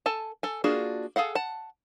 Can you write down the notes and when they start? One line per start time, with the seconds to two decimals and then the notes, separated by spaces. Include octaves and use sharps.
0.06 A4 G#5 A5
0.43 A4 G#5
0.64 A#3 D4 F4 F#4 G#4
1.16 G#4 A4 F5 F#5
1.35 F#5 A5